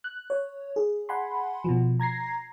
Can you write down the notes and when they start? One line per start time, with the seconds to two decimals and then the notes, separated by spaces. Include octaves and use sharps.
0.04 F#6
0.30 C#5
0.76 G#4
1.09 F#5 G#5 B5 C6
1.64 B2 F3
2.00 A#5 G#6 A#6 C7